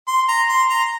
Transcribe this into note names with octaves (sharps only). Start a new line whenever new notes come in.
C6
A#5
C6
A#5